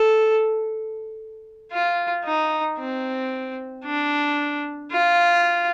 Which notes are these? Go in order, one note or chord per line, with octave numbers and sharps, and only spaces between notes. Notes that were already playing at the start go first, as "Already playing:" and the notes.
Already playing: A4
F4
D#4
C4
D4
F4